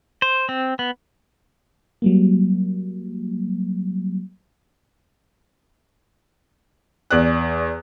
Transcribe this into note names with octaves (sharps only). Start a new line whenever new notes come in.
C5
C4
B3
F#3 G3 A#3
E2 D5 F#6